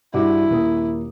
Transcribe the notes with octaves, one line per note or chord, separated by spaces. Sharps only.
G2 E4 F#4 D6
D#1 A#3 D#6